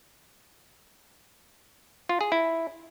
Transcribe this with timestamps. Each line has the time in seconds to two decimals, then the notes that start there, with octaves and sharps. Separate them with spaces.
2.09 F4
2.21 G#4
2.32 E4